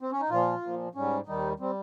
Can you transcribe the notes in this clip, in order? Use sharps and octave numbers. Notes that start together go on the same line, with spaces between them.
C4
C#4
D#4
A#2 F3 F4
A#2 F3
G#2 G3 C#4
D#2 D#3 G3 D#4
G3 C4